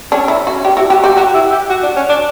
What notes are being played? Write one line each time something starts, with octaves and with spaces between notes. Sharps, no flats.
C#4 D4
E4
F#4
C#4
D4 G4
E4 F#4
F#4 G4
F#4 G4
F#4 G4
E4
G4
F#4
D4
C#4
D4